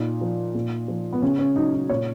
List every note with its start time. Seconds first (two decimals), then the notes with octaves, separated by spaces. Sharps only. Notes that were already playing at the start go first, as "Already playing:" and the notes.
Already playing: A#2 D#4
0.21 F3
0.55 A#2
0.88 F3
1.12 B3
1.22 C#3 C#4
1.39 C#4
1.56 F#3 D#4
1.73 D#4
1.89 A#2 C#5